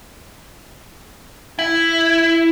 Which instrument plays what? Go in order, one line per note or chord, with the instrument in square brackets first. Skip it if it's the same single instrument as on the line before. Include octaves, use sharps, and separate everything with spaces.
[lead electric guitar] E4